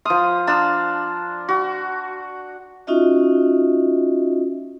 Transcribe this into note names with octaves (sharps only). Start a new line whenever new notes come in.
F3 C6 D#6 F6
D4 A5 A#5 C6 F6
F#4
C#4 D#4 F4 F#4 D#5 E5